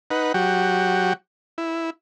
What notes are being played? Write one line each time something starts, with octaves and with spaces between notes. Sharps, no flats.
D#4 B4 F#5
F#3 F#4 G4
E4